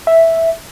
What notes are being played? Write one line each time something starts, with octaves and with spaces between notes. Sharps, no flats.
E5